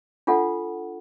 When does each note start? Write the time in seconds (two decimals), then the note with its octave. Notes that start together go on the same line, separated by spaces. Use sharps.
0.27 D4 F4 A4 F#5